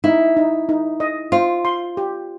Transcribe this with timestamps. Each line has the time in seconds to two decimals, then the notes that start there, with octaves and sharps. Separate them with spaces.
0.04 D#4 E4
0.37 D#4
0.69 D#4
1.00 D#5
1.32 F4 C5
1.65 C6
1.97 G4